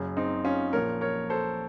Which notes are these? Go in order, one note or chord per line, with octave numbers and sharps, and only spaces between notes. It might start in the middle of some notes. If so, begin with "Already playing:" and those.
Already playing: F#1 F#2 C#3
C4 D#4
C#4 F4
A#1 A#2 F3 A#4 C#5
A#4 C#5
A4 C5